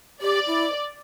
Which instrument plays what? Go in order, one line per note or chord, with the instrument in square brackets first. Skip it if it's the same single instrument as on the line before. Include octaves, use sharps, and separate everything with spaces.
[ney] G4 [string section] D5
[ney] E4